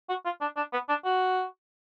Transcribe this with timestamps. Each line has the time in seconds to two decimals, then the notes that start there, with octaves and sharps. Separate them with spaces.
0.09 F#4
0.25 F4
0.41 D4
0.57 D4
0.73 B3
0.89 D4
1.05 F#4